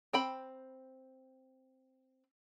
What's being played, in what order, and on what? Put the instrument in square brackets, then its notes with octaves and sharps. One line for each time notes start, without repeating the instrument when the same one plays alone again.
[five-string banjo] C4 G5 B5